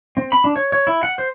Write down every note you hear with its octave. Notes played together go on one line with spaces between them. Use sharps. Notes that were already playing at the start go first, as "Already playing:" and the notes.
C4
B5
D4
C#5
C#5
E4
F#5
C5